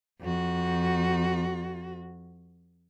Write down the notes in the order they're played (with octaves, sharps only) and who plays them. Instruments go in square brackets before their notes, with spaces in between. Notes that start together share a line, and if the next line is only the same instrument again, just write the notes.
[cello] F2 F#4